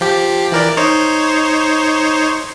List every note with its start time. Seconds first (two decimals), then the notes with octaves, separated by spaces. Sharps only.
0.01 F3 G4
0.52 E3 A#4 D5
0.77 D#4 C5 C#5